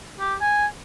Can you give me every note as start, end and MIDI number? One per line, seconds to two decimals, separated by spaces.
0.20 0.35 67
0.41 0.66 80